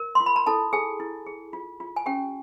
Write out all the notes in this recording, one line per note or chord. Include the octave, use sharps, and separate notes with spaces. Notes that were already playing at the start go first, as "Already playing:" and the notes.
Already playing: A#4
C6
F4
B5
A#5
E4 A4 A5
G#4 A4 G#5
E4
G#4
F4
F4
G#5
C#4 G4 G5